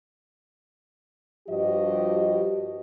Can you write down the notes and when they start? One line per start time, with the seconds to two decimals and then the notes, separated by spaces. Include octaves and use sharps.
1.48 G2 F3 F#4 G4 D#5